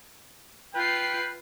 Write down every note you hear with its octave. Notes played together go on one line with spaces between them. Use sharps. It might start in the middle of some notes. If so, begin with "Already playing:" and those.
F4 B4 G5 C7